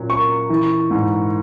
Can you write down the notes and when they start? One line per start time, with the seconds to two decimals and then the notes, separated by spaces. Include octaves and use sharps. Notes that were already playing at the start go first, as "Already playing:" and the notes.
Already playing: A#2 F#3 C#4
0.09 A#3 C#6
0.50 E3
0.91 G#2